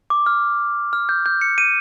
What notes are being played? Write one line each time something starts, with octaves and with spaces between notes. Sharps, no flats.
D6
F6
F6
G6
G6
C#7
D#7